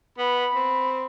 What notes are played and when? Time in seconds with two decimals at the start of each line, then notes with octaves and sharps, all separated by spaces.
0.18 B3 B5
0.55 C4